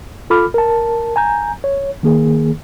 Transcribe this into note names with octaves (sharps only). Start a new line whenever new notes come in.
F4 A4 B5 D6 F6
A#4 A5
G#5 A#5 G6
C#5
D#3 A#3 G#4